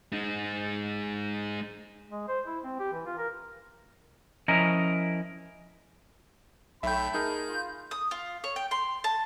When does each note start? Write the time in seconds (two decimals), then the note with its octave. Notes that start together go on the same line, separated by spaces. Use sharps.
0.12 G#3 D#4
2.10 G#3
2.28 C5
2.47 E4
2.64 C4
2.80 G4
2.93 E3
3.06 F4
3.18 A#4
4.48 F3 C#4 E4 A#4 D#5 A#5
6.83 B1 A3 E5 G5 B5 G6
7.14 D#4 G#4 A#4 G6
7.49 F4
7.91 D#6
8.11 F4
8.44 C#5
8.56 G5
8.71 C6
9.04 A5